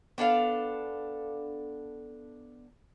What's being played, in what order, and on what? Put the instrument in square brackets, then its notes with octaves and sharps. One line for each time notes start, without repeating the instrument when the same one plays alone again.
[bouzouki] B3 D4 A4 F5